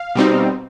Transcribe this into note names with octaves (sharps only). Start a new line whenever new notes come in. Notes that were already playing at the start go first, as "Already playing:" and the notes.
Already playing: F5
B2 G3 C4 D#4